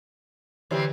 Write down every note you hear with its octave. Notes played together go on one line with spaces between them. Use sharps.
D3 E3 G3 C4 G4 C#5